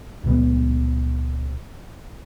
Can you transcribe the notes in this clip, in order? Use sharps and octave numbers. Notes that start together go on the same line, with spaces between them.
C#2 A#2 B3